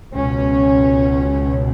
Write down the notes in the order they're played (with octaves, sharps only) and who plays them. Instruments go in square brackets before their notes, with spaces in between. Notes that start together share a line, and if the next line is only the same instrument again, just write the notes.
[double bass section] C#2 B2 C#4